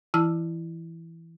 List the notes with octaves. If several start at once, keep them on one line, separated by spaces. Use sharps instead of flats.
E3 E4 A5 E6 F6